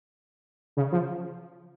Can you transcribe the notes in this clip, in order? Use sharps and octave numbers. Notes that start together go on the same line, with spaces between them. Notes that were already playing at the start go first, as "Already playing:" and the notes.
C#3
F3